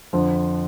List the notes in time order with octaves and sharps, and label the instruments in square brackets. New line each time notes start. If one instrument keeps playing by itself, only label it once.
[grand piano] F2 D3 F3